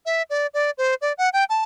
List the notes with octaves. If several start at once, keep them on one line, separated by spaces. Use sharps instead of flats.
E5
D5
D5
C5
D5
F#5
G5
A5